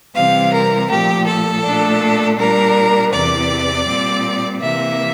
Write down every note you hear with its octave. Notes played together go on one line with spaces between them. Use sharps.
C3 E3 G3 C4 F5
A#4
A#2 F3 A3 G4
A4
A#2 A3 D4
A#2 G3 D4 A#4
E2 C3 E3 D5
A#2 G3 C4
C3 E3 A#3 E5